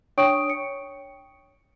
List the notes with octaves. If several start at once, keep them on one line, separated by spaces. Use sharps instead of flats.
D4 C#5 G5 C#6 D#6 D7
C#7